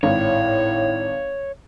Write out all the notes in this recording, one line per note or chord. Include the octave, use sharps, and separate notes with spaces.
G#1 A2 C#5